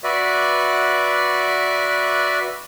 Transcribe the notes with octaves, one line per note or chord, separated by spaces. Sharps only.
F#4 B4 D5 E5